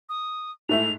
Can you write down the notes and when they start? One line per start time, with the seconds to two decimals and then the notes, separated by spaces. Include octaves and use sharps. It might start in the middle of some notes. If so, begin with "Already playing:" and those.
0.09 D#6
0.69 G#2 A3 E4 F7